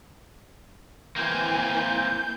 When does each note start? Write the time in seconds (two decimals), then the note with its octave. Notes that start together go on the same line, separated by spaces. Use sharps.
1.16 E3 A#3 C4 G#5 G6